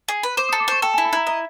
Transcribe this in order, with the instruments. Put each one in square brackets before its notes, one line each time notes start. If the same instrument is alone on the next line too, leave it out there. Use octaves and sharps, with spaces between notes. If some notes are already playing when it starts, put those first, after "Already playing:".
[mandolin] G#4
B4
[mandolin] C5 [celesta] D6
[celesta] D#6
[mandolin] A4
[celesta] D6
[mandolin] C5 [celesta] C#6
[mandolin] A4 [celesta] G5
[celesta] G#5
[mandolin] E4
[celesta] B5
[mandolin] E4 [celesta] A#5
[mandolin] D#5 [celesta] A#5